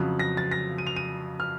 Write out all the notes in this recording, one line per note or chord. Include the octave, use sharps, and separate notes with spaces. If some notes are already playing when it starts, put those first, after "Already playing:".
Already playing: F2 C#3 F#3 F#6
A#6
A6
A#6
D#7
F7
D#7
F6